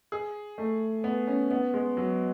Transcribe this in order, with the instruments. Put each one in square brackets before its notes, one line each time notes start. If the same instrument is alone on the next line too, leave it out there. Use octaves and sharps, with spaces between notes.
[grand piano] G#4
A3
B3
C#4
B3
G#3
F#3